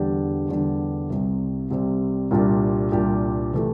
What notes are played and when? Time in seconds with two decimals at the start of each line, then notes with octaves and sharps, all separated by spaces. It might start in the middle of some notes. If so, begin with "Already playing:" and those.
Already playing: E2 D3 G3 D4 G4
0.48 E2 D3 G3 D4 G4
1.10 C2 C3 G3 C4
1.70 C2 C3 G3 C4
2.31 C2 A#2 G3 D4 G4
2.92 C2 A#2 G3 D4 G4
3.53 C3 E3 A3 E4